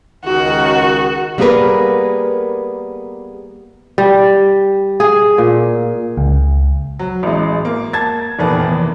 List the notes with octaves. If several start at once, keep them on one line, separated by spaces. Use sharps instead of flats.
C#2 D#3 F#4
G3 A#3 B3 G#4 A#4 B4
G3
G#4
A#2
C#2
F#3
A1 G#3
A#3
A5 G#6 A6
F1 E2 A#2 D#3 B3
E2